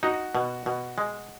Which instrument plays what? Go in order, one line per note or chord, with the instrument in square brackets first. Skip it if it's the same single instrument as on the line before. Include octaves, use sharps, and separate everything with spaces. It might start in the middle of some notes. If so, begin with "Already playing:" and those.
[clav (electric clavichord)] D#4 [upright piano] F#4
[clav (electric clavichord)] B2
B2
G#3